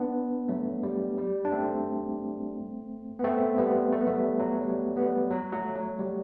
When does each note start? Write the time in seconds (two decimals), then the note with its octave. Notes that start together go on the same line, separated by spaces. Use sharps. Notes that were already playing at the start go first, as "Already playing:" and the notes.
Already playing: B3 D4
0.49 F#3 A3
0.83 G3
1.18 G3
1.45 D4
1.52 A3 C4
3.19 B3
3.24 A3 C4
3.58 G3 B3
3.93 A3
4.01 B3
4.07 F#3 A3
4.15 G3
4.39 F#3
4.62 G3
4.96 G3 B3
5.30 F#3
5.53 F#3 A3
5.76 F#3
5.99 G3